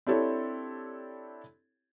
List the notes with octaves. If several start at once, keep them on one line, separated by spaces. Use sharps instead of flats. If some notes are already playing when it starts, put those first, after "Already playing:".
C4 D4 E4 G4 A4 C#5